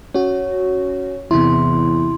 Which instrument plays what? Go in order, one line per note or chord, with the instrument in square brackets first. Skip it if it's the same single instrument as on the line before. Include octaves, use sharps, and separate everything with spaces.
[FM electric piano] C#4 F#4 [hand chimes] C#5
[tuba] E2 [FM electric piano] C3 E4 [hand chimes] C6